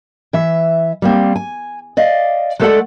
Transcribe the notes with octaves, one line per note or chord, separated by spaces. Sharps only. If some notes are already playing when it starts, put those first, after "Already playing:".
E3 E5
G3 A#3 C4
G#5
D5 D#5 F5
G#3 A3 B3 A4 D5 F#5